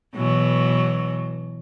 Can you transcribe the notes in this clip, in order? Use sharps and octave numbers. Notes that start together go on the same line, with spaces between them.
B2 E3 F#3